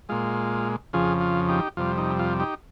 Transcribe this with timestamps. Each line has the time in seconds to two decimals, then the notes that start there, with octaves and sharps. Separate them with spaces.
0.09 A#2 G#3 F4
0.93 F2 C#3 F3 F4 G#4
1.21 F4
1.48 D#4 G4
1.77 F2 C3 G3 F4
1.98 D#4
2.19 F4
2.40 D#4 G4